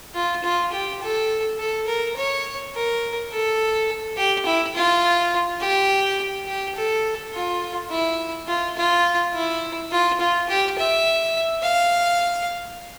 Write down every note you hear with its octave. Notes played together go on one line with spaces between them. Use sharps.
F4
F4
G4
A4
A4
A#4
C#5
A#4
A4
G4
E4
F4
G4
G4
A4
F4
E4
F4
F4
E4
F4
F4
G4
E5
F5